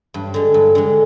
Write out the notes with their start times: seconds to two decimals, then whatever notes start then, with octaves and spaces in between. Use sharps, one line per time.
0.14 G2
0.34 D3 G#3
0.54 G2
0.75 D3 G#3